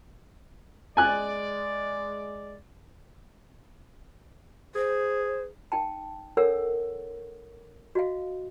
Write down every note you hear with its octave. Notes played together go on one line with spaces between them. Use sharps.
G#3 D5 G#5 F#6
G#4 C5
D#4 G5 A5
D4 A4 A#4 C#5 F#5 E6
F#4 D#5 F5